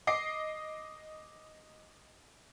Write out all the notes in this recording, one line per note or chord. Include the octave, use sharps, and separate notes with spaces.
D#5 D6 C7